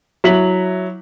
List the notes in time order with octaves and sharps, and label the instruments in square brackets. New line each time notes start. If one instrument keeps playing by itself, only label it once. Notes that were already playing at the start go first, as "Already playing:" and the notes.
[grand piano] F#3 E4 B6 F#7